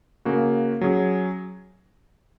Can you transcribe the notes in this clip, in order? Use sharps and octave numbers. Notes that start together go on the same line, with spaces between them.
C#3 A#3 F#4
F#3 C#4 G#4